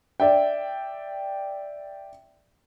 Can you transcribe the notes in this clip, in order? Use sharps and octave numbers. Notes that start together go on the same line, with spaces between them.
D5 E5 G5